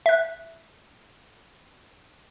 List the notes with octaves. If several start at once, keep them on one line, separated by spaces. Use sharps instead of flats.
E5 F#6